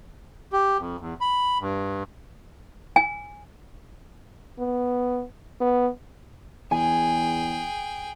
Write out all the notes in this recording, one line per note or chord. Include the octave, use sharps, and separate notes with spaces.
G4
F2
E2
B5
G2
G#5
B3
B3
E2 G#4 G5 G#5